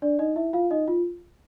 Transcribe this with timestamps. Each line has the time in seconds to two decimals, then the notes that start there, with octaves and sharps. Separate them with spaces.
0.02 D4 D5
0.19 D#4 D#5
0.36 E4 E5
0.53 F4 F5
0.71 D#4 D#5
0.88 F4